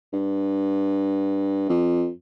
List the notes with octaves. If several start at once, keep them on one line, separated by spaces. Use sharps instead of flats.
G2
F2